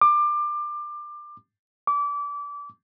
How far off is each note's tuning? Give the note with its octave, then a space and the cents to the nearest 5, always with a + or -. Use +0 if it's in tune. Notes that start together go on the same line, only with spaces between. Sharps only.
D6 +25
D6 -25